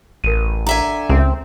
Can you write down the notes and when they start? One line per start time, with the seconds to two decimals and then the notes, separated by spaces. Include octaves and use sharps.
0.24 A1 A#4 D#7
0.67 D3 E5 G#5 A#5
1.09 C#2 C4